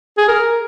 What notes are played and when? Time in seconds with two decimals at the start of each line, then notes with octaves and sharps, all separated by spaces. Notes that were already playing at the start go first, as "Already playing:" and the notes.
0.18 G#4
0.28 A#4